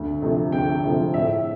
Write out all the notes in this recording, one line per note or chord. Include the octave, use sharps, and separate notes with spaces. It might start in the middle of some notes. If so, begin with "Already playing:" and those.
Already playing: D2
C3 F3 A3
D2 G5
C3 F3 A3
A2 E5